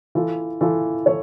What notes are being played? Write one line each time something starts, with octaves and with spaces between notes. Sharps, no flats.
E3 F4 A4
E3 F4 A4
E3 A4 C#5